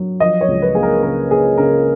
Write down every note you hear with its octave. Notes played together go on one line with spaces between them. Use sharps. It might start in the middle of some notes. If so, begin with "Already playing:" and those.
Already playing: F#3
F3 D#5
C#5
C#2
B4
A#3 G#4
A#4
C#3 A#4
A#3 G#4
C#3 A#4